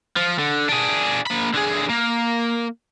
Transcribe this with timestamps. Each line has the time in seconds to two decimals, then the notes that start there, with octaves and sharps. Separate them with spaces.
0.16 F3
0.39 D3
0.69 D4 G#4
1.26 A#3 B5
1.54 D3 G#4
1.89 A#3